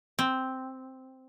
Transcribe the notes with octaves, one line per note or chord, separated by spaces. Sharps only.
C4